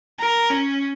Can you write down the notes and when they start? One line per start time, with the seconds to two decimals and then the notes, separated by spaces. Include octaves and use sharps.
0.19 A#4
0.51 C#4